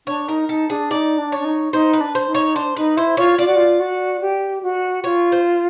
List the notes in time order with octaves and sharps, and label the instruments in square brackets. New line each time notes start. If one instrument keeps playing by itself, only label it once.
[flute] D4 [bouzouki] C#5
[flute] D#4 [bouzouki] A#4
[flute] D#4 [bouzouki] A4
[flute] D4 [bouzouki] G#4
[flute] D#4 [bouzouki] D5
[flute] D4
[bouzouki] C#5
[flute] D4
D#4
[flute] D#4 [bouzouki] C5
[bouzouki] B4
[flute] D4
[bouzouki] C5
[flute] D#4
[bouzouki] C#5
[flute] D4 [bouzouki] C5
[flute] D#4 [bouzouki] B4
[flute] E4 [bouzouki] C5
[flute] F4 [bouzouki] C#5
[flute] F4 [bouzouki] D5
[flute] F#4
F4
F#4
G4
F#4
[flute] F4 [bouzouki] C#5
[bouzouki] C5